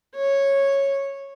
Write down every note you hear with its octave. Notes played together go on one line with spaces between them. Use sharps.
C#5